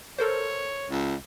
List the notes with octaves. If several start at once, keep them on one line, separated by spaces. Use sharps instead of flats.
A4 A#4 C5 C#5
C#2